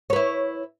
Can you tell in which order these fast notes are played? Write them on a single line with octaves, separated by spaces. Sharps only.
C#5 B4 E4